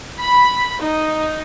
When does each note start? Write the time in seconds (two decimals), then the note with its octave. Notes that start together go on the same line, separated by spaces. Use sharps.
0.21 B5
0.82 D#4